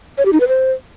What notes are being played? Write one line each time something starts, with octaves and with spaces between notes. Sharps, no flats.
C#5
G4
D#4
B4
C5